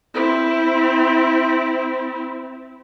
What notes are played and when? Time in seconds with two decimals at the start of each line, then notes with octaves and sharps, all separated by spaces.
0.14 C4 E4